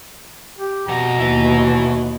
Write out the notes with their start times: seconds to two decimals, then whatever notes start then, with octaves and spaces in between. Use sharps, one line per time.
0.58 G4
0.88 F2 B2 F#5 A#5
1.19 D#2 E4 B4